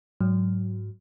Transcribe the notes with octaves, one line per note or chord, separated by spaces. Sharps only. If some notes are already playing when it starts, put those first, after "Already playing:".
G#2 F#3